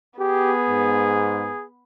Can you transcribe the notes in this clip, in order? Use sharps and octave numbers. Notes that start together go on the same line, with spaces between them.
B3 G4 G#4
G#2